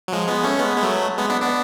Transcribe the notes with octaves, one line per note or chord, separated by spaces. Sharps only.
F#3
F3 G#3
G#3 B3
A3 C#4
G#3 B3
G#3
F#3 A3
G#3 B3
B3 D4
B3 D4